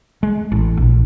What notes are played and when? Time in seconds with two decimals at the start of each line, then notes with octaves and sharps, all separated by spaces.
0.23 G#3
0.52 A1
0.77 A#1